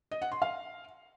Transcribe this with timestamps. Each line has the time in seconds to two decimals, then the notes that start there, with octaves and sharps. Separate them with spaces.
0.11 D#5
0.22 F#5
0.32 C6
0.42 F5